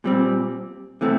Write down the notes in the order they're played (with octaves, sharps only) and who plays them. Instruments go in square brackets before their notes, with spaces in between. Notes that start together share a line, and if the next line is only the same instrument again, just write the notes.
[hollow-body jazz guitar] A#2 G3 C4
C3 E3 A3 C4